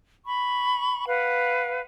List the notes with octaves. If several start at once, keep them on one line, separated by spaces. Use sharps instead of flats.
B5 C#6
B4 F5 F#5